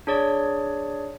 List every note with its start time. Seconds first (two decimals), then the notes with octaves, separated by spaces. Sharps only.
0.07 D4 G#4 C#5 D5